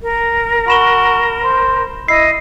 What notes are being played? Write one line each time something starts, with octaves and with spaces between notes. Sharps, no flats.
A#4
F#4 B5 E7 G7
C5
E4 D#5 C7